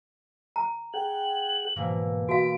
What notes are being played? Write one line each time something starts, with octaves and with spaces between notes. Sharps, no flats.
A#5
G#4 F#5 G5 F#7
G#2 B2 E3 A#3
F#4 F5 B5 D7